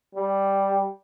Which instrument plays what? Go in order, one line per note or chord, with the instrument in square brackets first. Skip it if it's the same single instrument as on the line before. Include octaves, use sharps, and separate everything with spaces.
[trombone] G3